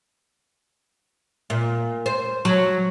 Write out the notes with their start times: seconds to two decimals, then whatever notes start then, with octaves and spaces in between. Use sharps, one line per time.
1.50 A#2
2.06 C5
2.45 F#3